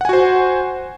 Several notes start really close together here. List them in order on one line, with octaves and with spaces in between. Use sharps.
F#5 G#5 F#4 C5